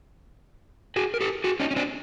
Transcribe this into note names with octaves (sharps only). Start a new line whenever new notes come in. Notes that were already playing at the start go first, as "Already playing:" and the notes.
F#4 G#4
A#4
G4 A4
F#4 G#4
C#4 D#4
C#4
C4 D4